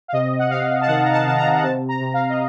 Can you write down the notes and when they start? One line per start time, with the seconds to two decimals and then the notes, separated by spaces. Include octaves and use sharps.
0.08 F5
0.13 C3 D#5
0.39 F#5
0.50 C3 F5
0.81 A5
0.88 D#3 F#5
1.03 A#5
1.13 A5
1.26 C3 A5
1.38 A#5
1.56 F#5
1.63 C3 A5
1.89 A#5
2.00 C3
2.14 F5
2.29 D#5